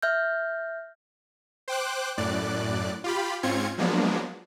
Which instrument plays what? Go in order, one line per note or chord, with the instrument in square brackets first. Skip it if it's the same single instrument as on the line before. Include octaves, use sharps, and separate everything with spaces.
[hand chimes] E5 F6 G6
[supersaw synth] C5 G5 D6 F#6
F#2 A2 D5 F#6
F4 G4 B5
G#2 C4 C#4 F4 G#6 C#7
F3 F#3 G#3 A#3 B3 D4